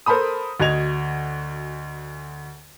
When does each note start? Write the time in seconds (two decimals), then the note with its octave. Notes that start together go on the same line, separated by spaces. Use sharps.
0.06 A4 A#4 C5 A5 B5 D#6
0.60 D2 F#4 D#5 G#6 F7